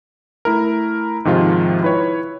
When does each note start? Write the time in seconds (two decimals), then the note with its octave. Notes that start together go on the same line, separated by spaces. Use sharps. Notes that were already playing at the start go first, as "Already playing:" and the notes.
0.45 A3 E4 A#4
1.25 G#2 C3 D#3 F3 F4
1.82 E4 B4 C#5